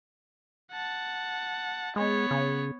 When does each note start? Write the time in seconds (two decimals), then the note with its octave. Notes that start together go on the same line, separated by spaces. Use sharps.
0.72 F#5 A5
1.96 G#3 B3 C#5
2.31 C#3